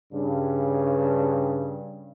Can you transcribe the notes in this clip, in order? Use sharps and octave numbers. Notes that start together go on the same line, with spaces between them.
G2 C#3